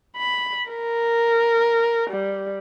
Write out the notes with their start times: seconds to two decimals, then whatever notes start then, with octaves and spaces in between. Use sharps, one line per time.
0.17 B5
0.69 A#4
2.10 G3